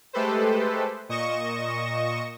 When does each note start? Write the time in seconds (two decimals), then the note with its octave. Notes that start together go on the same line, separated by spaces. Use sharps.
0.13 G#3 A3 G4 A4 B4 C5
1.09 A#2 D#5 C#6 A#6 C#7 E7